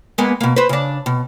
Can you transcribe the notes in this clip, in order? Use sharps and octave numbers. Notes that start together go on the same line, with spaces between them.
G#3 A#3 B3
B2 A#3
B4 C5
C#3 D4
B2